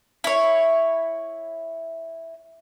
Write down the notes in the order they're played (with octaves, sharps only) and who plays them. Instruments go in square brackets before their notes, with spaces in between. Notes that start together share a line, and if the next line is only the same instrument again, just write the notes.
[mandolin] E4 C#5